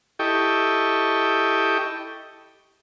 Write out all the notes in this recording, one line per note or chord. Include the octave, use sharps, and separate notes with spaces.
E4 G4 A4 D#5 G5 C#6